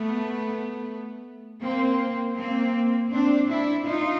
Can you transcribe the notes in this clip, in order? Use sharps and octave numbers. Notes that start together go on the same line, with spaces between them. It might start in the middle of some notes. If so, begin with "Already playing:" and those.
Already playing: A3 B3
A#3 C4
A#3 C4
C4 D4
D4 E4
D#4 F4